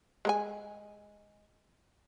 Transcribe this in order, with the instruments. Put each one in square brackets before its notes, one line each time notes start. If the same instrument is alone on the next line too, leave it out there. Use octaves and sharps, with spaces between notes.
[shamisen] G#3 A#4 G#5